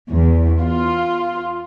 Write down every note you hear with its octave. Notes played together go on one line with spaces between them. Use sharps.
E2
F4